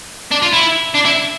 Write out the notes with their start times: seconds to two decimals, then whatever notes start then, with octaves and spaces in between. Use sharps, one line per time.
0.32 D4
0.42 F4
0.53 E4
0.94 D4
1.05 E4